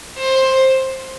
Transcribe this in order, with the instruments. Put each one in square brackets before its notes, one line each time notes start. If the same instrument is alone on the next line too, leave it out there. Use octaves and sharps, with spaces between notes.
[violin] C5